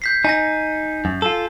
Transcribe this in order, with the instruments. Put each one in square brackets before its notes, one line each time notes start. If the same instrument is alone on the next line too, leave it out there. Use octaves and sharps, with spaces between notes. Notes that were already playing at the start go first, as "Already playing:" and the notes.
[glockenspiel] G6 B6 C7
[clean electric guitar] D#4 [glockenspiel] G#5 A#6
[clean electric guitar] F#2
F4 A4